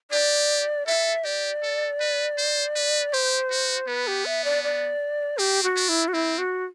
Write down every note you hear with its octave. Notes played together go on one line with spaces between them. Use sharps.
G4 D5
A4 E5
G4 D5
A4
B4
C5
B4
G4 C5
F#4
B3 B4
G4
E5
D5
D5
C4 G4
F#4
D4
E4
F#4
C4 E4
F#4